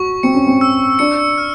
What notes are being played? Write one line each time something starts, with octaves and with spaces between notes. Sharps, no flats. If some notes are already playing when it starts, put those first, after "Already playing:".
Already playing: F#4 C#6
C4 C#7
C#4
C4
E6
D4 C#7
F6